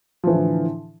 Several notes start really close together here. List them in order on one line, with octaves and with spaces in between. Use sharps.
F3 E3 A2 D3